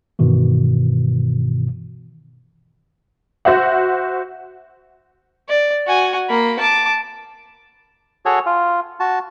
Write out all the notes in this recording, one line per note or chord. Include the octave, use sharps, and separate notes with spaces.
G2 B2 D#3 E3
F#4 C5 E5 F#5
D5
F#4 G#5
A#3 B5
A5 D6
F#4 G#4 A4 C#5
F4
F#4 A5